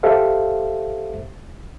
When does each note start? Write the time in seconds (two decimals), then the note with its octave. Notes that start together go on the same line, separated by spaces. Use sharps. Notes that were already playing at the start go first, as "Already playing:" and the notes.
0.03 G4 A4 C5 E5 F5